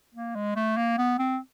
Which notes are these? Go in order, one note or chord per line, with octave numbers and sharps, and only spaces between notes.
A#3
G#3
A3
A#3
B3
C4